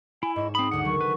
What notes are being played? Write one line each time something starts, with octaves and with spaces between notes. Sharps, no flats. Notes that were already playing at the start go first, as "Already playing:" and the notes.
E4 G#5
G#2 C#5 D#5 E7
C4 B5 D#6
G1 D2 D3 F#5
D3 D#3 F#3 C#6
B4